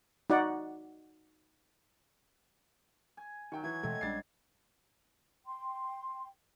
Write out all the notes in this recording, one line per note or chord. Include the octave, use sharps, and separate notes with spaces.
D#4 F#4 D5 F#5
G#5
D#3 F#3 G5 C#6
E3 G#6
B2 D#3 E3 G#3 A3 C4
A#1 C#3 G3 G#3 D4 A6 C7
G5 C6